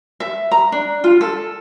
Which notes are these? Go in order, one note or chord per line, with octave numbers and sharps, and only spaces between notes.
E5
A#5
D4
F4
A4